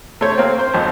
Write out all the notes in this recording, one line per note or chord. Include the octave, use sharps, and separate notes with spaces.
A3 C5 C#5
A#3 C4
C5
G#1 F2